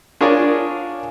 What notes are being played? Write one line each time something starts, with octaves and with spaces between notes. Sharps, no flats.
D4 F4 G#4 A#4 C#5 D5